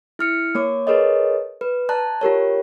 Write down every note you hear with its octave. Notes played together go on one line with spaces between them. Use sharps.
E4 F6 C#7
A#3 C#5 D6
G#4 A#4 B4 C#5 D#5
B4
D5 A5 A#5 F#6
F4 G4 A#4 C#5